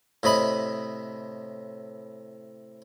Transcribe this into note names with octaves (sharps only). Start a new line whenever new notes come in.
A2 C3 D#5 B5